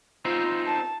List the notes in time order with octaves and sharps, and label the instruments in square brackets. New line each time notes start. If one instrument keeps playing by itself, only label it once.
[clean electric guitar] C4 D#4 C5 [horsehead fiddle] F4
[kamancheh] A5